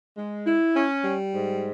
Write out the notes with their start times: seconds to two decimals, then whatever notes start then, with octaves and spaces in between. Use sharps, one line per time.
0.16 G#3
0.45 E4
0.75 C#4
1.04 G3
1.33 G#2